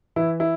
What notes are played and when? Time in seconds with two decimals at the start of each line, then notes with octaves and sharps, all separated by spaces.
0.16 E3 E4
0.40 E4